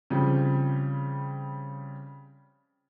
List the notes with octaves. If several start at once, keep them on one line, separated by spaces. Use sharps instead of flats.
C#3 F3 G3 C4